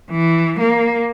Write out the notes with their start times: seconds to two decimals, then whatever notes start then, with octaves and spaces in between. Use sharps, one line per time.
0.11 E3
0.59 A#3